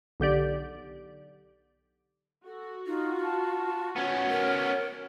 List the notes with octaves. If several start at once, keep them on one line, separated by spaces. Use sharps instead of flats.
B1 D3 G4 D5
F#4 A4
D#4 F4
A5
B3 C#4 F#5 G#5
A#4